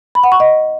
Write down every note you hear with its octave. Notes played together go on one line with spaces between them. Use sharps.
B5
F#5
C#6
D#5